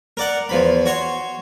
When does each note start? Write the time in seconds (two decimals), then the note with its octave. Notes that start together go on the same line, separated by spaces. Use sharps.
0.17 A#4 D5 F#5
0.49 E2 F3 B5
0.86 F#4 C#5 C6